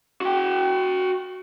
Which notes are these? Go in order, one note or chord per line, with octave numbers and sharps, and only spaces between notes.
F#4 G5